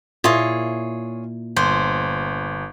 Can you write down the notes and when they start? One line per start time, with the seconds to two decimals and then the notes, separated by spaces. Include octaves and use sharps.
0.24 A#2 E4 F4 G#4 C#5
1.56 G1 C5